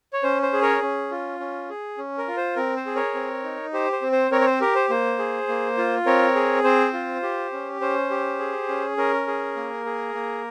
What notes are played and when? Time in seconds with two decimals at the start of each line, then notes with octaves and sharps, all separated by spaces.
0.13 C#5
0.23 C#4 C5
0.42 C5
0.53 G#4
0.62 A#4 C#5
0.81 C#4
1.11 F4
1.40 C#4
1.70 G#4
1.98 C#4
2.18 A#4
2.28 F4
2.37 C5
2.56 C4 A#4
2.76 C5
2.86 G#4
2.96 A#4 C#5
3.14 C4
3.44 D#4
3.73 G4 C5
3.93 C5
4.02 C4
4.12 C5
4.31 C4 A#4 C#5
4.41 C#5
4.46 C5
4.61 G4 A#4
4.75 C5
4.89 A#3 C5
5.19 G#4
5.48 A#3
5.78 F4
6.06 C4 A#4 C#5
6.35 G#4
6.64 C4 C5
6.93 F4
7.23 G4
7.52 C#4
7.81 C#4 C5
8.11 G4
8.39 G#4
8.69 C#4
8.97 C#4 A#4
9.27 G#4
9.56 A#3
9.85 G#4
10.14 A#3